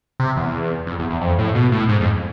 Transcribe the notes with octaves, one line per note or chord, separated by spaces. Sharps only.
C3
E2
F2
E2
E2
F2
A2
B2
A2
G#2
F2